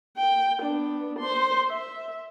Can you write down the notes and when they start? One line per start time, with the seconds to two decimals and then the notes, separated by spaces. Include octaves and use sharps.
0.17 G5
0.63 B3 D4
1.19 C5 C6
1.67 E5